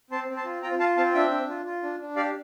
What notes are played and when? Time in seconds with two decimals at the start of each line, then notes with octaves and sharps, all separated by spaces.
0.11 C4 A5 C6
0.28 C4
0.36 A5 C6
0.45 F4
0.62 F4 G5 A#5
0.79 F4 F5 A5
0.97 C4 F5 A5
1.14 D4 E5 G5
1.31 D4
1.49 F4
1.65 F4
1.82 D4
2.00 D4
2.16 G4 D5 F5